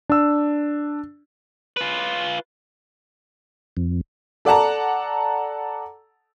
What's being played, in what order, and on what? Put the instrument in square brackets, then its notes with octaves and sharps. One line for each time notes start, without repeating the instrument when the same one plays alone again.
[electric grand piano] D4 E6
[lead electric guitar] F4 B4
[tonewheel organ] F2
[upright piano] A4 D5 F#5 A5 A#5